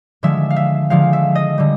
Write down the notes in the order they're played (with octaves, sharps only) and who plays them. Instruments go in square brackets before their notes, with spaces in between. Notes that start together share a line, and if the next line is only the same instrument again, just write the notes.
[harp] D3 F3 G#3 E5
F5
E5
D3 F3 G#3 F5
E5
D#5
D3 G3